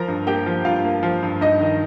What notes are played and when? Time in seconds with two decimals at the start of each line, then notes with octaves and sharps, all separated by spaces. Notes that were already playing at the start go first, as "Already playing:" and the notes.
Already playing: F3 A#4 A#5
0.08 G2
0.27 A#3 G4 G5
0.46 F3
0.65 G2 F4 F5
0.84 A#3
1.03 F3
1.23 G2
1.41 G2 D#4 D#5
1.61 D#3